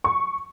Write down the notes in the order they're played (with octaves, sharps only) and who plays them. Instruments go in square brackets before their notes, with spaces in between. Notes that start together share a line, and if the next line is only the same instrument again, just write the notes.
[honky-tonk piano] C#6